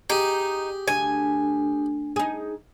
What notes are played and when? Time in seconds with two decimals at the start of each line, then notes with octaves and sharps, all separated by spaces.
0.10 D#4 G4 G#4
0.88 D2 G#5
2.16 D#4 G#4